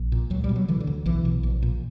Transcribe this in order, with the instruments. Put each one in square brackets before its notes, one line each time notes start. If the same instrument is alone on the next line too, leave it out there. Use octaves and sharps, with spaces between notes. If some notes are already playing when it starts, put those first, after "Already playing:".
Already playing: [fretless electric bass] A#1
A#2
C#2 F#3
G3
B2
F#3
D3 E3
D3
D2
B1 E3
B2
A#1
A#2